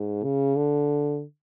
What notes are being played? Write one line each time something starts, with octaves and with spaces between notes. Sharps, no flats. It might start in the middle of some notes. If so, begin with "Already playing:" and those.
Already playing: G#2
C#3
D3